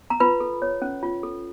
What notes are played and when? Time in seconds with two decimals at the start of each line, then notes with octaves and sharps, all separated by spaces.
0.10 A#5
0.20 F4 B4 B5
0.40 A4
0.62 C#5
0.82 C#4
1.03 F4
1.23 A4